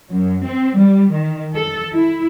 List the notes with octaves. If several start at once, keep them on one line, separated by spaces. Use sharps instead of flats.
F#2
C4
G3
D#3
A4
E4